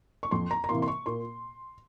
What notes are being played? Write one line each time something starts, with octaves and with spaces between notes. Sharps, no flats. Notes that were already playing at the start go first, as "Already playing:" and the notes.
C#6
F2 C6
A#5
A#5
C3 E3 A#3 C6
C6
C#6
A#2 C6